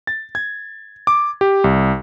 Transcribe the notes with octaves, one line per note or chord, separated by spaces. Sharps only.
A6
G#6
D6
G4
C2